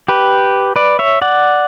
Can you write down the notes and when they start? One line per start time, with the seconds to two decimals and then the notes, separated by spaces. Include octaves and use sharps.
0.08 G4 B4
0.76 B4 D5
0.99 C#5 E5
1.22 D5 F#5